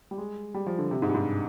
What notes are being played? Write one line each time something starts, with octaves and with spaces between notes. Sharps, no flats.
G3
G#3
G3
F3
D3
C3
G#2
G2
G#2